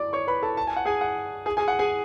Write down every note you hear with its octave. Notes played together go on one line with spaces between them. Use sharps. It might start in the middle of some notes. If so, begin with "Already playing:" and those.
Already playing: D5 D6
C#5 C#6
B4 B5
A4 A5
A5
G#5
F#5
G#4 G#5
F#5
G#4 G#5
G#4 G#5
F#5
G#4 G#5